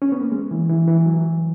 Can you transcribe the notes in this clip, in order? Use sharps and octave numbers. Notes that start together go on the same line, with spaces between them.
C#4
B3
A#3
G#3
E3
E3
E3
F#3